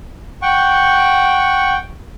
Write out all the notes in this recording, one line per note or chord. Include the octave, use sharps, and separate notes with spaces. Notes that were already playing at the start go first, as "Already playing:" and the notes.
F#5 G5 C#6